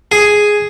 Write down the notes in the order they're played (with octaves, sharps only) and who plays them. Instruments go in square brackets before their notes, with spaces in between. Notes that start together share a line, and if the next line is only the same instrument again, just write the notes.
[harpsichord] G#4